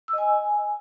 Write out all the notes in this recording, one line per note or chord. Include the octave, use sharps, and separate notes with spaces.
E6
D#5
G#5